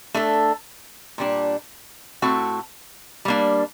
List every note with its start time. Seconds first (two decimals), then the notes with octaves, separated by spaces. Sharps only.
0.14 A3 D4 A4
1.18 A#2 G3 D4
2.22 A2 A3 C4 F#4
3.25 G3 A#3 D4